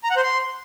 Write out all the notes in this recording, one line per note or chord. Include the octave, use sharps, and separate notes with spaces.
A#5
F#5
C5
C6